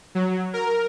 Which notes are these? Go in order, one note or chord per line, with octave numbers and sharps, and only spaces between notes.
F#3
A#4